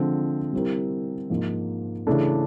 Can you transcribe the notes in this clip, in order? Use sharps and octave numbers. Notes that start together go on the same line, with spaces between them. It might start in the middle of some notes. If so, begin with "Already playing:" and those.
Already playing: D3 F3 G#3 C4
G3 C4 E4 G4 A#4
G#2 F3 A#3
C#3 E3 A3 D4